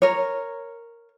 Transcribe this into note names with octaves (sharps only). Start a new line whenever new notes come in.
A#4 C#5